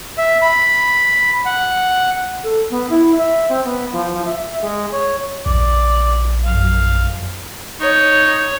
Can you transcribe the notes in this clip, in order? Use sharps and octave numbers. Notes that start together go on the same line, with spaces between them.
E5
B5
F#5
A4
B3
E4
E5
C4
B3
F3
F3
E5
G#3
C#5
A#1 D5
F#2 F5
D#4 C#5